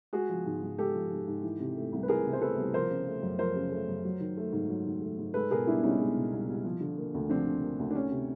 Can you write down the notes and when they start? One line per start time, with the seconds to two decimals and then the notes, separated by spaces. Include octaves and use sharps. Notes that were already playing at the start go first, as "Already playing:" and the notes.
0.13 G#3 F#4 G#4
0.29 F3
0.46 G#2
0.63 G#2
0.78 G#3 G4 A4
0.94 F3
1.11 G#2
1.28 G#2
1.43 E3
1.60 C3
1.77 A3
1.92 C2
2.03 B4
2.08 E3 G#4 A#4
2.25 C3
2.33 C5
2.42 A3 A4 B4
2.57 C2
2.74 F3 A#4 C5
2.90 C#3
3.07 A3
3.22 F#2
3.39 F3 A#4 C5
3.56 C#3
3.72 A3
3.88 F#2
4.05 F#3
4.20 D#3
4.37 A3
4.53 G#2
4.69 F#3
4.86 D#3
5.02 A3
5.19 G#2
5.34 G#3 A4 B4
5.50 B2 G#4 A#4
5.67 C2 D4 E4
5.84 C2 C#4 D#4
6.00 G#3
6.16 B2
6.33 C2
6.49 C2
6.65 F3
6.80 D3
6.98 A#3
7.14 D2
7.30 F3 C4 D4
7.46 D3
7.63 A#3
7.79 D2
7.91 D4
7.95 D#3 C#4
8.11 C3